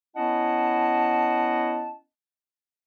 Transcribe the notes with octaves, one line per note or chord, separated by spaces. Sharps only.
B3 C#4 E4 D#5 F#5 A5